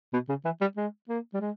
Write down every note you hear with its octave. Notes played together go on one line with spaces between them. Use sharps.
B2
C#3
E3
G3
G#3
A#3
G3
G#3